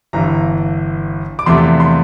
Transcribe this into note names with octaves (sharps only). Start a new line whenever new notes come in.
G1 G2 E3 A#5
D6
E2 C3 F3 A3 C6
C6